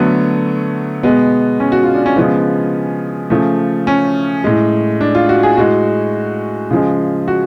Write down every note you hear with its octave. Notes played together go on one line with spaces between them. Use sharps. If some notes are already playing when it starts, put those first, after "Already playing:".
Already playing: D3 F#3 A3 B3
B2 G#3 B3
C#4
F#4
F4
D4
C#4
C#3 F3 G#3 B3
C#3 F3 A3
C#4
A2 G#3
D4
F4
F#4
G#4
A2 G#3 F#4
C#3 F3 G#3
F#4